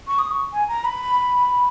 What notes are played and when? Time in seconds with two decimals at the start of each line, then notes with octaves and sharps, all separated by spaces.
0.07 C#6
0.19 D#6
0.31 C#6
0.53 G#5
0.68 A#5
0.84 B5